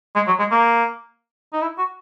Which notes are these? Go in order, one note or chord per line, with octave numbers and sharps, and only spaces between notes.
G#3
F#3
G#3
A#3
D#4
E4
F#4